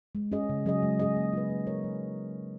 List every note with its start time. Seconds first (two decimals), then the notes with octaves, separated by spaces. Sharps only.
0.15 G#3
0.32 C#4 G#4 D#5
0.49 C#3
0.66 F#3 C#4 G#4 D#5
0.83 G#3
0.99 C#4 G#4 D#5
1.16 A#3
1.33 F4 B4
1.50 A#3
1.67 D#4 A#4 C#5
1.84 F#3